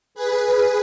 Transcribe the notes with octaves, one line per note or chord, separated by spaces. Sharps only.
G#4 B4